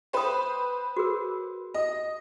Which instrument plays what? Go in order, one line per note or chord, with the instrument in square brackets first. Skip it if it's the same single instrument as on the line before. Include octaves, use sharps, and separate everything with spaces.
[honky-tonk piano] B4 C5 [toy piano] G5 D#6
[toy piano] F#4 G#4 A#4
[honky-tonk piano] D#5